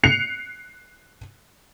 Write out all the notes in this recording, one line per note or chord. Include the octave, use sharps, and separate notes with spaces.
F#6 C7 C#7 F7